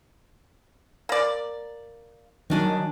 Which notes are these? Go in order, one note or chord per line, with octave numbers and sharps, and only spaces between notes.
A#3 D5
D#3 F#3 D4 G#5